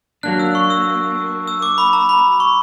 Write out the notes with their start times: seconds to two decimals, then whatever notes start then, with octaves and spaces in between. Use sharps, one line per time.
0.23 F#3 A#3 D4 F#6
0.39 E6
0.55 C#6
0.70 E6
1.48 E6
1.62 D6
1.78 B5
1.93 A#5
2.09 B5
2.40 C#6